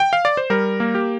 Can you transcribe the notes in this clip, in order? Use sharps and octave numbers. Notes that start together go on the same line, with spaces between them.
G5
F5
D5
C5
G3 A#4
A#3
G4